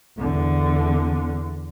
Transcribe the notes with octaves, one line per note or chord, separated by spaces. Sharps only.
E2 D3